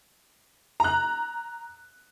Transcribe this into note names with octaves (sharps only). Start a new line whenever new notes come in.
A#5 F#6